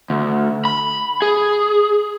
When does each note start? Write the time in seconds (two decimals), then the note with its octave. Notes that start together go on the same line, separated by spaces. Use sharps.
0.10 D2
0.65 B5
1.22 G#4